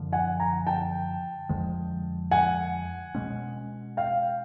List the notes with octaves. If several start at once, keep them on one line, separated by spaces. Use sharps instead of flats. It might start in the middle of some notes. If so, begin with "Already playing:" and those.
Already playing: F#2 D3 F3
F#5 G#5
G#5 A#5
G5 A5
F2 D3 F3 G#3
F#5 G#5
B2 G#3 C#4
F5 G5